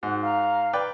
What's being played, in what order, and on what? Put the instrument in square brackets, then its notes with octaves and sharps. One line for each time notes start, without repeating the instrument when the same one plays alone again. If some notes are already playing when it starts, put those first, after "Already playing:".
[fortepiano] G#2 [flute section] F#4
[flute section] F5 A#5
[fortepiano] B4 D5 G5